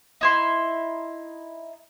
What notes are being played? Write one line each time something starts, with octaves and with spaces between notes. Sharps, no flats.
D#4 E4 C6